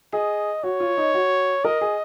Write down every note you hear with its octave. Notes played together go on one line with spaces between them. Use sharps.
G#4 D#5
F#4 C#5
F4
D#4
F#4
A#4 D#5
G#4